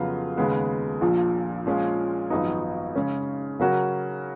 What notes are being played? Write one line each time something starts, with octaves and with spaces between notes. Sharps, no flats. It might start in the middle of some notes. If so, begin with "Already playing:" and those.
Already playing: F2 C#3 F#3 B3 F4
D#2 C#3 G#3 B3
A#1 A#2 F3
A#2 F3 G#3 C#4 F4
G#1 F#2 F3 B3 D#4
C#3 G#3 C#4
C#3 F#3 C#4 F#4 A#4